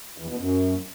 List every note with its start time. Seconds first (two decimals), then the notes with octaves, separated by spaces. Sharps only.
0.18 E2
0.29 B2
0.39 F#2